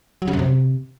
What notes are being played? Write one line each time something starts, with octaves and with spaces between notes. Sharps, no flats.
F#3
C#3
F#2
C3